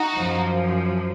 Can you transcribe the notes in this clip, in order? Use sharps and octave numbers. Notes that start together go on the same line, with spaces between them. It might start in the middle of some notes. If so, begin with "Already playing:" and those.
Already playing: D#4 F#4
F#2 F3